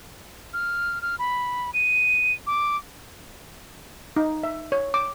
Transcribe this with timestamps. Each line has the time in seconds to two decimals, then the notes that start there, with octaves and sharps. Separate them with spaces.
0.54 F6
1.02 F6
1.19 B5
1.74 D#7
2.47 D6
4.16 D#4
4.43 E5
4.72 C#5
4.94 D6